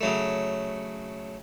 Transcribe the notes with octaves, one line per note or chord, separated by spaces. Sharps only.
C#3 F#3 A3